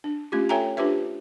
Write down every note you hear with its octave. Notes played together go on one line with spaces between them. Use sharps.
D4
A3 C#4 F4 G4
A4 C#5 E5 G5 G#5 A#5
D4 F4 G4 B4 C5 E5